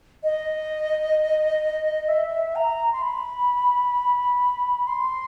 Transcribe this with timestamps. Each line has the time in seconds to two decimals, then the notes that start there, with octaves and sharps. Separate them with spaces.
0.23 D#5
2.08 E5
2.56 A#5
2.92 C6
3.02 B5
4.87 C6